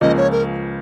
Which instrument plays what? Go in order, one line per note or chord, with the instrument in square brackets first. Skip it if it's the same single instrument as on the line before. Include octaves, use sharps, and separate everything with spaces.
[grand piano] C#2 C#3 F3 A#3 [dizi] D#5
[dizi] C#5
A#4